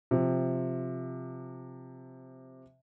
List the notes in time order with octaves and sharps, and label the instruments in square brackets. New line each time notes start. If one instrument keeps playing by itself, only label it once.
[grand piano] C3 F3